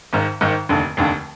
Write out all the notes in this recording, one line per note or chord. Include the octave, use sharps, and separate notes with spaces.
G#1 G#2 D#3
G#1 G#2 D#3
F1 D#2 D3
F1 D#2 D3